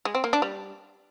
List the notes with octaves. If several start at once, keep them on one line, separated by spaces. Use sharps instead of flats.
G#3
C4
A#3
D4
G3